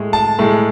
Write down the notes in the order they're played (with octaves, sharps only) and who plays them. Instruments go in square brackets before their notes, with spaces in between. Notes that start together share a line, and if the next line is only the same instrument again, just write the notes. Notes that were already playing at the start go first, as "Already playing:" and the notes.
Already playing: [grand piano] A2 G#3
A5
A2 G#3